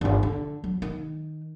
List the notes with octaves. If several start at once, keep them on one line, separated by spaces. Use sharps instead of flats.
G1 E2
D3
F#3
D#3